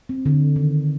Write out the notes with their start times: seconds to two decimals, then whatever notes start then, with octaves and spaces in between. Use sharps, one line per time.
0.09 C4
0.26 D3
0.56 D#3